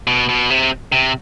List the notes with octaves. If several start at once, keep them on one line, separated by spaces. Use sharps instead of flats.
B2
B2
C3
C3